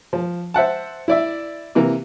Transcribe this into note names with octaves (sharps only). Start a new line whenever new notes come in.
F3
C5 E5 F#5 A5
E4 D5 E5
C3 E3 A#3